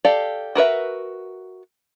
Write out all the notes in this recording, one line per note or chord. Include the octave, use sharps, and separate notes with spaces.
G4 A4 D5 F5
F#4 A#4 B4 E5